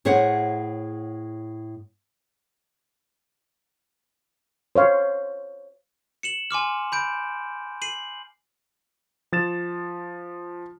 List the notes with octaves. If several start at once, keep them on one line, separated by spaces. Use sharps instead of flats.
A2 G#4 C5 C#5 E5 F#5
C5 C#5 F5
C#7 E7 F#7
G#5 C6 D6 F6
B5 G6 D7
C7 D#7 F#7
F3 A6 E7